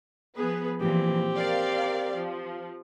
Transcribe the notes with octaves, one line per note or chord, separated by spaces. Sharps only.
F3 B3 G#4 B4
A#2 E3 F3 C4 G4
A#4 D5 F5
F3